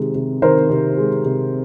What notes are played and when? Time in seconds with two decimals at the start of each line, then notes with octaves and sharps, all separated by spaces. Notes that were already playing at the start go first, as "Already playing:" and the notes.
Already playing: C3 D#3 G#3
0.15 C3
0.42 D#3 A#4 C5
0.70 C3
0.98 G#3
1.25 C3